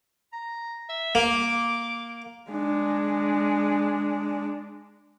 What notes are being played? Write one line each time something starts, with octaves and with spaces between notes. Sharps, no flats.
A#5
E5
A#3 D6
G#3 D4